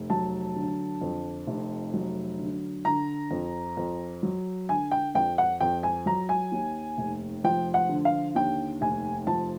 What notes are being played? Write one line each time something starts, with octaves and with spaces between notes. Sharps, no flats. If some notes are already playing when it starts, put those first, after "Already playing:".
Already playing: F1
F#3 A5
D3
F2
F1
F#3
D3
D3 A#5
F2
F2
F#3
D3 G#5
G5
F2 G5
F#5
F2 G5
G#5
F#3 A#5
G#5
D#2
F1
F3 G5
F#5
D3
F5
D#2 G5
F1 G#5
F3 A5